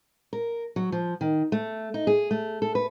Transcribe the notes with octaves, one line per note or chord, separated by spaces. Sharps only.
A#4
F#3
F3
D#3
A3
D#4
G#4
A3
A4
B4